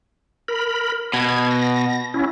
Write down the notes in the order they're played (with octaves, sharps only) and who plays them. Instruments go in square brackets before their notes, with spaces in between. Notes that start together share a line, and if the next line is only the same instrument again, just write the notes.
[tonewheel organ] A#4 B5
[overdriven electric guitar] B2 [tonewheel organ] G#6
[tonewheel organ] A#6
C#4 E4